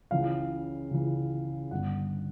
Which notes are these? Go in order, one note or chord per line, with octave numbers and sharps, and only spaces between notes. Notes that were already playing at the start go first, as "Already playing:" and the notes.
C#2 C#3 E3 F5
C#2 C#3 E3
G1 G2 D3 F#5